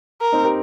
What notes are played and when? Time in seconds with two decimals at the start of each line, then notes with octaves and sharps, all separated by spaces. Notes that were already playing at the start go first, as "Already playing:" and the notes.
0.21 A#4
0.32 C4 D#4
0.44 G4 A#4